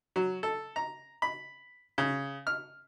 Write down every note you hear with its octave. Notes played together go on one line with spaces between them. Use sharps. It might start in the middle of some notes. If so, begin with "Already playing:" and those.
F#3
A4
A#5
B5
C#3
F6